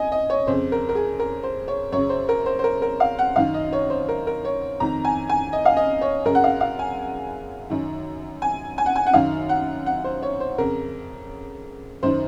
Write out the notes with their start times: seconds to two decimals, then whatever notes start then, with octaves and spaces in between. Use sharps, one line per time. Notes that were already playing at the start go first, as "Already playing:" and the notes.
Already playing: D#5 G#5
0.12 D#5
0.30 C#5
0.47 F2 C#3 C5
0.72 A#4
0.89 A#4
0.95 G#4
1.19 A#4
1.43 C5
1.68 C#5
1.92 F#2 C#3 C#5
2.09 C5
2.29 A#4
2.46 C5
2.59 C5
2.64 A#4
2.82 A#4
3.00 F5
3.19 F#5
3.36 F#2 D#3 F5
3.54 D#5
3.72 C#5
3.90 C5
4.09 A#4
4.27 A#4
4.45 C#5
4.80 F2 D#3 A#5
5.05 G#5
5.29 G#5
5.53 D#5
5.65 F5
5.77 D#5
6.01 C#5
6.25 F#2 C#3 A#4
6.35 F#5
6.44 F5
6.61 F5
6.79 G#5
7.70 F#2 D#3
8.42 G#5
8.78 G#5
8.86 F#5
8.96 G#5
9.06 F#5
9.14 F#2 D#3 F5
9.49 F#5
9.86 F#5
10.04 C5
10.22 C#5
10.40 C5
10.58 F2 C#3 A#4
12.03 F#2 D#3 C5